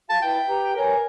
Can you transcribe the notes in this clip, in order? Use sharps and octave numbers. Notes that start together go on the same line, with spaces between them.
F#4 F5 A5
E4 B4 E5 G5
G4 B4 A#5
A#4 B4 C#5 G#5